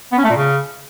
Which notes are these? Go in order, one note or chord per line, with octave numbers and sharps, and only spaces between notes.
B3
C#4
A3
A#2
C#3